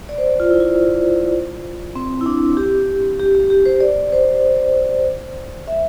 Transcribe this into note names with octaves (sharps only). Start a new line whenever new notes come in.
D5
C5
D5
F4
E4
F4
C4
E4
D4
G4
G4
G4
G4
C5
D5
C5
E5